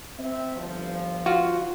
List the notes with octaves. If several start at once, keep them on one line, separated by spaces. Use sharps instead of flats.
C4 E5
G1 F3
F4 F#4